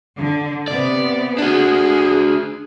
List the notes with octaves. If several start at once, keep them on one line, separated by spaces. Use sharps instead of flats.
D3
C3 B3 D5
D4 F#4 G#4